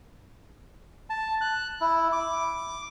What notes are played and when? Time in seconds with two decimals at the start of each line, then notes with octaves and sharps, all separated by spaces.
1.10 A5
1.41 F#6
1.81 E4
2.12 D6